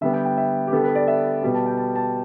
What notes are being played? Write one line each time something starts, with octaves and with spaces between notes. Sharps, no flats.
D3 G3 B3 E5
G5
G5
E5
G4
D3 G3 B3 A4
B4
D5
E5
B2 G3 B3
A5
G5
A5
A5